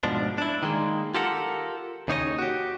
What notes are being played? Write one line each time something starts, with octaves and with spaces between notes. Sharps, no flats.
G#2 B2 F3 D4
D4 E4
D#3 G3 G#3 A#3
F4 G4 A4 A#4 F#5
D#2 C#3 D#4 E4 C#5 D#5
F#4 G4